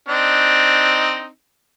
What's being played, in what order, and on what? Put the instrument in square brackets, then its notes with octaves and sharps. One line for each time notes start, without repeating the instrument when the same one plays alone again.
[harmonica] C4 D4 D#4